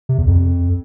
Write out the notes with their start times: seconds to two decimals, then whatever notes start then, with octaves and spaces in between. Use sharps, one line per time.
0.09 C3
0.18 E2
0.27 F2